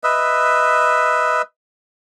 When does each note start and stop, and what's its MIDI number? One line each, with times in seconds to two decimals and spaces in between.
0.04 1.42 71
0.04 1.42 75
0.04 1.42 76